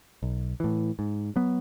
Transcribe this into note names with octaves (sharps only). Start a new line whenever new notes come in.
B1
A2 E3
G#2
F#3 B3